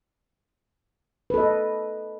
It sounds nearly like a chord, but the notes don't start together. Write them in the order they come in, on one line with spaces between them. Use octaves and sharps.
B4 A4 D#5